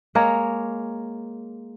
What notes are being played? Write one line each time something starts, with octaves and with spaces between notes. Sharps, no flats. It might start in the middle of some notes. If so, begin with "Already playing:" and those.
G#3 A#3 A#4 C#5